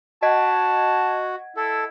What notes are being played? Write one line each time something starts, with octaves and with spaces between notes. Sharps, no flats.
F#4 D#5 F#5 A5 G#6
E4 A4